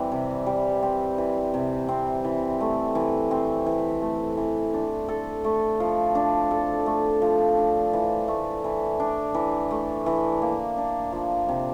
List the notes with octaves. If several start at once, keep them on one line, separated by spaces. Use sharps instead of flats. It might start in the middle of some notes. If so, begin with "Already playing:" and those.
Already playing: E3 G3 C4
C3
G3
C4
E3
C3
C4
E3
A3
E3
C4
E3
A3
E3
D4
A4
A3
F3
D4
A4
A3
F3
D4
E3
A3
E3
D4
E3
A3
E3
A#3
D4
F3
C3